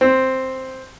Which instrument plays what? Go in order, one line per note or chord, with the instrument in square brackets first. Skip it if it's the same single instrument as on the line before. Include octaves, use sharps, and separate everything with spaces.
[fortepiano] C4